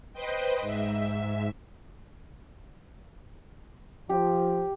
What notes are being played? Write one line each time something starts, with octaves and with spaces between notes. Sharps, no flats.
B4 C5 D#5 G5
G#2 E5
F3 G4